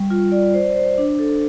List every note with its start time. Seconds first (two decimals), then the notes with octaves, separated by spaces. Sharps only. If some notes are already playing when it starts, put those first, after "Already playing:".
Already playing: G3
0.10 F4
0.32 D5
0.54 C5
0.76 C5
0.98 D4
1.19 A4